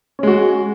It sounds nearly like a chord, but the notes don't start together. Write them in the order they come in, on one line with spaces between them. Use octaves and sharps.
C#4 G#3 F#4